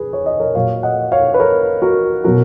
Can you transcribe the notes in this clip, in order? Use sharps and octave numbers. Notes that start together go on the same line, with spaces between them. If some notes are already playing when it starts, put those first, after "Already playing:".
Already playing: G#4 B4
C#5
D#5
A#4 C#5
A#2 F#3 C#5 F5
D#5 F#5
C#5 F5
B4
A#4 C#5
F#4 A#4
B2 F#3 F#4 A#4